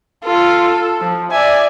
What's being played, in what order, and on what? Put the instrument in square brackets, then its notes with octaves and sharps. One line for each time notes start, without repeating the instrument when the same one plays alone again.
[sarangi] F4 [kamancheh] A4
[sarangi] F3
[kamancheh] D5 G#5 [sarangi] E5